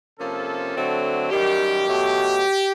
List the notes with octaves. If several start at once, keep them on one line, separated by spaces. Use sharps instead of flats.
C3 F3 A#3 C#4 A4
D3 F#3 A3 C4
F#2 D#3 G3 G4
B2 F#3 A3